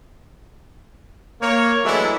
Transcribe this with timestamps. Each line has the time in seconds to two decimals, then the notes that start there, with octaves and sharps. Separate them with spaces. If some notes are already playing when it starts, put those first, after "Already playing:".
1.41 A#3 C#5
1.85 E3 F#3 G#3 A3 D4 E4